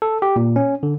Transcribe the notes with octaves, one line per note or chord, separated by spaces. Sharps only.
A4
G4
A#2
C#4
D3